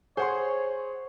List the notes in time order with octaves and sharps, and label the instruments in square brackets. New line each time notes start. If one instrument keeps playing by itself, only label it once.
[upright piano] G#4 F#5 C6 [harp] C5 [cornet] C#5